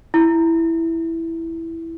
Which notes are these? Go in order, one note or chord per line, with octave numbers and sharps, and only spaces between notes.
E4